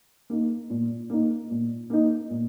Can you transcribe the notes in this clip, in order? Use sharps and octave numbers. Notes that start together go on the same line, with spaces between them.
A#3 D#4
A#2
A#3 D#4
A#2
A#3 D#4
A#2